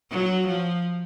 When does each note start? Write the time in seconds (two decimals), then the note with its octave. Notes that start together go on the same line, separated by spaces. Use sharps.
0.11 F#3
0.47 F3